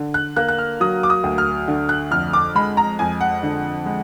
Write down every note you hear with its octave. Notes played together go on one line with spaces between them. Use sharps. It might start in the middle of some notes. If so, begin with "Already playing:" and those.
Already playing: D3
F#6
A#3 F#6
F#6
F6
F#3 D#6
D6
D#6
D2
F6
D3
F#6
F2 F6
D6
G#3 B5
A#5
F2 G#5
F#5
D3
G#3